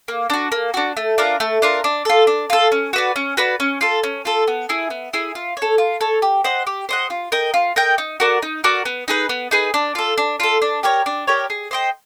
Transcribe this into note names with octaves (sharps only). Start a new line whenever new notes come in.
A#3
D4 F#4
A#3
D4 F#4
A3
D4 F4 A#4
A3
D4 F4 A#4
D4
F4 A4
D4
F4 A4
C#4
F#4 B4 D5
C#4
F#4 B4 D5
C#4
F4 A4
C#4
F4 A4
B3
E4 G#4
B3
E4 G#4
F4
C#5
A4
F4
A4 C#5
G4
C5 D#5 F#5
G4
C5 D#5 F#5
F4
A#4 D#5 G5
F4
A#4 D#5 G5
D#4
F#4 A#4 D5
D#4
F#4 A#4 D5
B3
D#4 G#4 B4
B3
D#4 G#4 B4
D4
F4 A4
D4
F4 A4
D4
G4 A#4 C#5
D4
G4 A#4 C#5
G#4
C5 D#5 G5